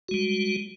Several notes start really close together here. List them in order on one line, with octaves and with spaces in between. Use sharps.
F#4 G#3 G3